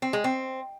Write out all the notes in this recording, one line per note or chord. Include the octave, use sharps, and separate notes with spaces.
C4
G#3
C4